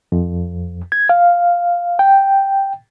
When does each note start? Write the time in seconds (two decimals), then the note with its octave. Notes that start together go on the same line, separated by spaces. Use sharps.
0.12 F2
0.92 G#6
1.09 F5
1.99 G5